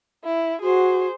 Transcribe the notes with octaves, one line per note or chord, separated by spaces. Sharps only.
E4
F#4 G#4 C5